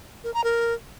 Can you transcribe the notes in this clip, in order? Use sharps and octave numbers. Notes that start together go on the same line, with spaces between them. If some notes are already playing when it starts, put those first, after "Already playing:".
A#4
A#5
A#4